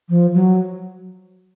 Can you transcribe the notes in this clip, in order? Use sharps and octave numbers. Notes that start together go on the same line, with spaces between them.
F3
F#3